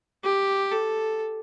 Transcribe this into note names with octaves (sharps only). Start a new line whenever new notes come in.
G4
A4